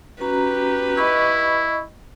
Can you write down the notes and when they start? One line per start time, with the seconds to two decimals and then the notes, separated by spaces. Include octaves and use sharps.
0.21 C#4 F#4 G4 B4 A#5
0.97 E4 D#5 B5 C#6